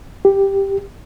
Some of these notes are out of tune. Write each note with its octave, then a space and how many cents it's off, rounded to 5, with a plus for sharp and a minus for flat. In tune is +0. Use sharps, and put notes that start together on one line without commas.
G4 +5